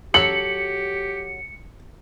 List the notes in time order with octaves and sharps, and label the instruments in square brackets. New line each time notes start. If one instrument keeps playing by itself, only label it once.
[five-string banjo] F#3 A4 [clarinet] G4 [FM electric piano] C#7 [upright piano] F#7